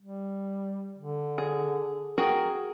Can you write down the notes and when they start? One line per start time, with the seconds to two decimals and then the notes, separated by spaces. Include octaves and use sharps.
0.01 G3
0.98 D3
1.38 G#4
2.18 F#4 G#4 A#4 G5